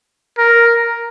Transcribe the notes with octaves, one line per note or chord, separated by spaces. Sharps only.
A#4